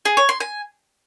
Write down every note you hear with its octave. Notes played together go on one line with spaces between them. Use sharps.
G#4
C#5
C6
G#5